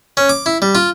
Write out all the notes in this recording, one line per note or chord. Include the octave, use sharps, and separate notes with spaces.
C#4
D6
E4
G3
F4